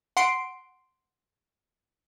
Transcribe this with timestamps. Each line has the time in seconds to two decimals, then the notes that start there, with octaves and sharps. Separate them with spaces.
0.17 F#5 C6 C7 D7